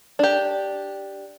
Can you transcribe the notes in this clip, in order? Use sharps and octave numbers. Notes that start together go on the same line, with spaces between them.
D4 G4